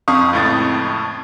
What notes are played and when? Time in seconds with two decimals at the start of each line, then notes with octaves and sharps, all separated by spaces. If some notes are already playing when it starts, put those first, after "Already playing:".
0.08 F2 F5 C#6 D#6
0.33 C#2 A2 A6